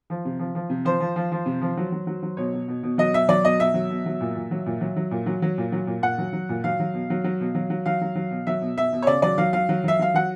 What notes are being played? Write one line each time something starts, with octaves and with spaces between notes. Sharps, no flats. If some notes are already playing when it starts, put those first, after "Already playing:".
F3
C3
F3
F3
C3
F3 C5
F3
F3
F3
C3
F3
F#3
F#3
F#3
F#3
B2 C#5
B2
B2
B2
F#3 D#5
B2 E5
F#3 D5
B2 D#5
B2 E5
F#3
B2
F#3
A#2
A#2
F#3
A#2
F#3
F#3
A#2
F#3
F#3
A#2
F#3
A#2
A#2 F#5
F#3
F#3
A#2
F#3 F5
F#3
B2
F#3
F#3
B2
F#3
F#3
F#3 F5
F#3
F#3
B2
F#3 E5
B2
B2 E5
B2
C#5
C#3 D5
F#3 D5
F#3 F5
F#3 F5
F#3
F#3 E5
F#3 F5
F#3 F#5